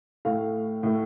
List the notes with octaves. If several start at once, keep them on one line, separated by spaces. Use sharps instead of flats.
A2 A3 F5
A2 A3